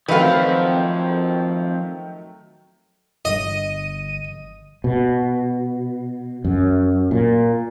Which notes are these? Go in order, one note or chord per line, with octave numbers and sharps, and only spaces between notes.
D#3 F3 F#3 A3 C4 B4 F5
G1 D#5 D#7
B2
F#2
A#2